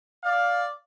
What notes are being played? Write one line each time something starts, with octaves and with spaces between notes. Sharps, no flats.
D5 F5